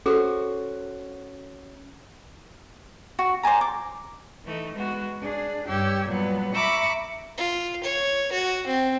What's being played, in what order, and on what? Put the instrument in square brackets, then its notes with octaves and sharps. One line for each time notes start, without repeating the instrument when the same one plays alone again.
[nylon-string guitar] C#4 F#4 C5 [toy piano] G#4 A4
[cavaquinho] F#4
C5 D5 G#5 A#5
D6
[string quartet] E3 A3 D#4
G#3 B3 F#4
D4 G#4
G2 G4 C#5 E6 G#6
A#2 F#3 G3 B3
E5 A#5 B5 C#6 D6 E6
[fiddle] F4
C#5
F#4
C4